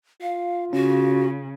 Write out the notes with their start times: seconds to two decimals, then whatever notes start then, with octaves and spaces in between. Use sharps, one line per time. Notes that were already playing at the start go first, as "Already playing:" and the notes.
0.22 F4 F5
0.73 C#3 C#4 F#4